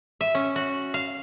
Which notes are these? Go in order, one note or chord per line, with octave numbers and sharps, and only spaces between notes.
E5
C#4
F#4
F5